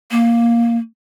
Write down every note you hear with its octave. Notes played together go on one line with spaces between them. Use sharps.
A#3